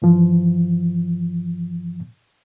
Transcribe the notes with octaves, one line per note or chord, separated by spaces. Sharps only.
G2 E3 F3